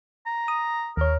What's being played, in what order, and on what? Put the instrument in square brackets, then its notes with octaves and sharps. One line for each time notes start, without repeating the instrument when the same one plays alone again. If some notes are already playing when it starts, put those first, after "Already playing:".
[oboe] A#5
[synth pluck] D#6
[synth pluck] D#2 C#5 [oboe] A#4